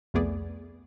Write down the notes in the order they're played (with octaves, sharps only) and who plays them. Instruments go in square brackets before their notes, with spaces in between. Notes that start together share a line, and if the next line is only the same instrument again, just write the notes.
[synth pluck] C2 F2 A3 B3 G#4 D5